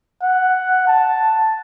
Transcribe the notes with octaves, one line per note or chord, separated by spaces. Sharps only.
F#5
A5